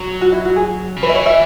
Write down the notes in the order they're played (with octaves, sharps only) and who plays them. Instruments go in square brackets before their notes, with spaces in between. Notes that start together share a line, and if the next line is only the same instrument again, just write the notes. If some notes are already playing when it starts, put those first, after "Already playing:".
Already playing: [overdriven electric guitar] F#3
[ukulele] F#4
E4
F#4
G#4
[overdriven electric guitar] C#3
[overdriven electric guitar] E3 [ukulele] B4
[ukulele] E5
C#5
E5